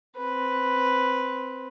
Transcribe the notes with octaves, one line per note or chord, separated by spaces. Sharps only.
C4 B4